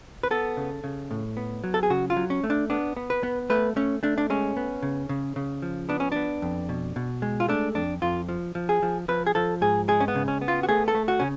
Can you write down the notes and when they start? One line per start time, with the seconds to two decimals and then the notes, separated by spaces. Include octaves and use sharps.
0.23 B4
0.31 B3 A4
0.57 C#3
0.84 C#3
1.11 A2
1.37 B3
1.64 F#3
1.74 A4
1.83 G#4
1.90 C#3 F#4
2.10 F4
2.17 F#3
2.30 C#4
2.44 A3
2.50 D4
2.70 B3 D4
2.97 B3
3.10 B4
3.23 B3
3.50 A3 B4
3.76 A3 C#4
4.03 A3 D4
4.18 D4
4.30 G#3 C#4
4.57 B3
4.83 C#3
5.09 C#3
5.36 C#3
5.62 F3
5.89 B3 D4
6.00 C#4
6.12 B3 D4
6.42 F2
6.69 B2
6.96 B2
7.22 G#3
7.40 F4
7.48 A3 D4
7.75 F2 D4
8.02 F2 F4
8.29 F3
8.55 F3
8.69 G#4
8.83 F3
9.08 F3 B4
9.27 G#4
9.35 F3 A4
9.61 G#2 G#4
9.88 G#3 G#4
10.00 C#4
10.08 B3
10.15 C#3
10.28 C#4
10.41 B3
10.48 F4
10.63 F#4
10.69 A3 G#4
10.88 A4
10.95 A3
11.08 F#4
11.20 C#3 C#4